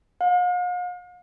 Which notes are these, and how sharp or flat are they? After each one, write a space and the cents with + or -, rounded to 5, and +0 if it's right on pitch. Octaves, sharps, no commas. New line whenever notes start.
F5 +45